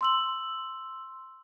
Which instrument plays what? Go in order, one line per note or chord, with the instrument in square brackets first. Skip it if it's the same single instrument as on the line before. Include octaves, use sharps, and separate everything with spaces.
[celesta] C6 E6 F#7